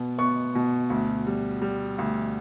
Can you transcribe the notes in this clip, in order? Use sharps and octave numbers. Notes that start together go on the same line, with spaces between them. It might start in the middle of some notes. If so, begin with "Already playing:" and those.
Already playing: B2 B3
B3 C#6
B2
D2
G3
G3
D2